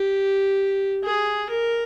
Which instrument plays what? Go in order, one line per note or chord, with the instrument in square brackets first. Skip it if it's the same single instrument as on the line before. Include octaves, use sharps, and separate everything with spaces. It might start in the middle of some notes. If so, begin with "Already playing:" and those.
Already playing: [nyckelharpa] G4
G#4
A#4